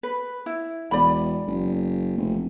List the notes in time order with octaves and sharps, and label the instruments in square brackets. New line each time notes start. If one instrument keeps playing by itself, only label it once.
[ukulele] B4
E4
[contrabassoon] E1 [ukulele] D5 B5
[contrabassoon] F#1
F1